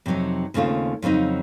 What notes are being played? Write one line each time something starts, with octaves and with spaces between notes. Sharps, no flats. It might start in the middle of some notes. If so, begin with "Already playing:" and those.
F2 C3 F#3 C4 D#4
D#2 C#3 A3 C4 F4
F2 C#3 F#3 C4 D#4